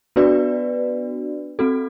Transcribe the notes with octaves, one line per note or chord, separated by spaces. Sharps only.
B3 D4 F#4 B4 D5
C4 F#4 A4